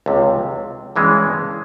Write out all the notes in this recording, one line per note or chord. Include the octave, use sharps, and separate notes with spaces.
C#2 C3 F3
G2 E3 G#3 C#4 F#4